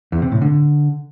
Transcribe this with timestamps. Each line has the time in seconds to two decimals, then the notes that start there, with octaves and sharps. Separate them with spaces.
0.12 E2
0.22 C3
0.32 A2
0.42 D3